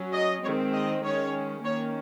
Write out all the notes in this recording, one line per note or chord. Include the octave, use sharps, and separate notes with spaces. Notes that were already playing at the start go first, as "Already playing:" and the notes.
Already playing: F#3 C#4
D#5
D#3 G#3 C4 C#5
D#5
D#3 G#3 C#4 C#5
D#3 A#3 C#4 C#5